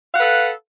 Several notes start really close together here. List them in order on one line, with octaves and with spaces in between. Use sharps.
F5 F#5 B4 A4